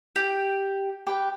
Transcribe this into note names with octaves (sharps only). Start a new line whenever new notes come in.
G4 G5
G4 B4 G5